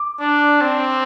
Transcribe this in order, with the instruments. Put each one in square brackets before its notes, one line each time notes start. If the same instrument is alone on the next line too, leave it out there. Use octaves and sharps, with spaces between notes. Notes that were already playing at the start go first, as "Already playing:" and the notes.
Already playing: [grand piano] D6
[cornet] D4
C4